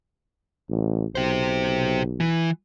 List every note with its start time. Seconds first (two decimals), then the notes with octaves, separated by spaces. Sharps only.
0.69 A1
1.15 B1 G4 C5
2.20 E3